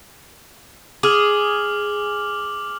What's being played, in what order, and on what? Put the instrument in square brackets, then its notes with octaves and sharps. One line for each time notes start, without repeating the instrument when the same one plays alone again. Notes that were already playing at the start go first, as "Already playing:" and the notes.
[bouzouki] G#4 [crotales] D6 F6 F#7